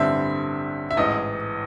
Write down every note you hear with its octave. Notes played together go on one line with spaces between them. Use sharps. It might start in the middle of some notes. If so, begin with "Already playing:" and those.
Already playing: A1 G2 D3 G3 C4 E5
E5
A1 G#2 E3 D#5